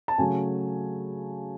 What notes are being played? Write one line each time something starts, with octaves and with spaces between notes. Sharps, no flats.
A5
C#3 F#3 A3 G#5